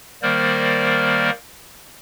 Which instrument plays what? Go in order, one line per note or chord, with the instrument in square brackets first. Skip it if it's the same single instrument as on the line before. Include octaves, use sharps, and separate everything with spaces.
[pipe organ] D#3 G3 A#3 A#4 C5 D5